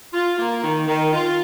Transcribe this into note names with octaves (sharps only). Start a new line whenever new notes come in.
F4
A#3
D#3
D#3
F4